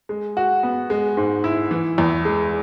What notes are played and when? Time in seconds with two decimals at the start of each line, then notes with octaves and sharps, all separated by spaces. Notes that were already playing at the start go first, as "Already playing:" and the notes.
0.09 G#3
0.37 F#4
0.63 B3
0.90 G#3
1.17 G#2
1.44 E4
1.71 E3
1.98 E2
2.25 G#3